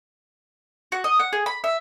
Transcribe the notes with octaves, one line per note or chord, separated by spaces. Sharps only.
F#4
D#5
F#5
G#4
B5
E5